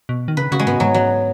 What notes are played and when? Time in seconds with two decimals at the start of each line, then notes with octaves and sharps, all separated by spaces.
0.09 B2
0.28 D#3
0.37 C#3 B4
0.52 C#3 F#4
0.59 G#3
0.66 G#2 B3
0.80 G#2 F#3
0.94 F#3